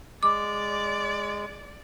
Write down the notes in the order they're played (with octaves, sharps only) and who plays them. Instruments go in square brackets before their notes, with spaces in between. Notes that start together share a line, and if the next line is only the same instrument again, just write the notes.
[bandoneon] G#3 [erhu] D5 [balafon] D6